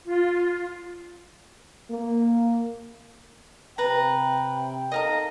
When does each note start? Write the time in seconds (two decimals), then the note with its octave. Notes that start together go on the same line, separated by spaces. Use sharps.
0.05 F4
1.91 A#3
3.78 C3 B4 G5 A#5
4.92 D#4 A4 A#4 D#5 F5 A#5